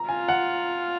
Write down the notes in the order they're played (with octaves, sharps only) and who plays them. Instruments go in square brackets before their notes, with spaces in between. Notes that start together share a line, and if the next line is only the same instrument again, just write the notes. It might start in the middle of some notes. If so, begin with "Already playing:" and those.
Already playing: [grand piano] A#5
[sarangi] F4 [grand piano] G#5
[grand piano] F#5